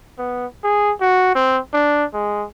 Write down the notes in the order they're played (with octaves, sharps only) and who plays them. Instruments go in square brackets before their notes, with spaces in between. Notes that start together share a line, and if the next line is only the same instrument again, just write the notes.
[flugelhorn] B3
G#4
F#4
C4
D4
G#3